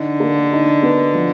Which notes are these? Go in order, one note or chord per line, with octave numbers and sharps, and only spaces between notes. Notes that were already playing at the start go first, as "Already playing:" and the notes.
Already playing: D3 D#4
A#3
D#4
B3
F3